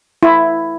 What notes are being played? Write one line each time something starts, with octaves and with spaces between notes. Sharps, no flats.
E4